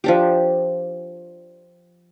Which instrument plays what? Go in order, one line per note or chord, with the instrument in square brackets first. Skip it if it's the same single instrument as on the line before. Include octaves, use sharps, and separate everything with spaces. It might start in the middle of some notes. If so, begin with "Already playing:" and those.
[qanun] F3 D4 G4